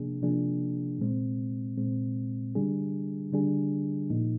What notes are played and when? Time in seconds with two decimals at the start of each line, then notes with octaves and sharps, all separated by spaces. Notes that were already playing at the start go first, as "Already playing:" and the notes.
Already playing: C3 F3 A#3 D4 G#4
0.22 C3 F3 A#3 D4 G#4
0.99 A#2 G#3 C4
1.77 A#2 G#3 C4
2.55 D3 G3 D4 G#4
3.32 D3 G3 D4 G#4
4.10 A#2 F3 A#3 D#4